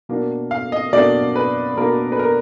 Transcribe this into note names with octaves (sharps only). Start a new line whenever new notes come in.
B2 A#3 D4
F5
D#5
B2 A#3 D4 D5
B4
B2 A#3 D4 A#4
B4
A#4